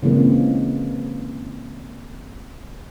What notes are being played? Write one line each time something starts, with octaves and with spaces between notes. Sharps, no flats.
C#3 E3 G#3 A#3 C4